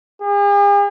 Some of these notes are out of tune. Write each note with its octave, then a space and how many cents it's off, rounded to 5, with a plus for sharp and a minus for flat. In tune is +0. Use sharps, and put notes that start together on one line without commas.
G#4 -45